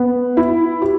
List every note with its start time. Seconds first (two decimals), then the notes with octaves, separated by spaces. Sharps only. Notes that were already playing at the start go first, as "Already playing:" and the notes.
Already playing: B3
0.37 E4
0.82 G4